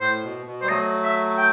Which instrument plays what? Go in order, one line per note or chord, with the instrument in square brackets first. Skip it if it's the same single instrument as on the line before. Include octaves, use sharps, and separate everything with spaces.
[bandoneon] A2 [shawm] C5
[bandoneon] B2
B2
[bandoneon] G3 [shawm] C5
[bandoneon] F#3 A3 [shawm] D#5
[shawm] E5
G5